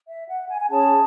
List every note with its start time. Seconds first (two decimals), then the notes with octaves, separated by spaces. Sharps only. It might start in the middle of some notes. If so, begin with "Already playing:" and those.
0.08 E5
0.28 F#5
0.48 G#5
0.60 G#5
0.69 C#4 G#4 C#5 A5